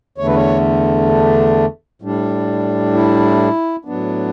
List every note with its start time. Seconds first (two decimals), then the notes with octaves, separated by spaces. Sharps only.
0.18 E2 D3 A3 C#5
0.27 B4
0.35 C#5
1.10 D4
2.02 A2 G3 D4
2.94 E4
3.85 A2 F#3 B3 D4